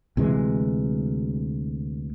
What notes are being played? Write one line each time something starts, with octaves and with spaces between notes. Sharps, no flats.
D2 C3 E3 G#3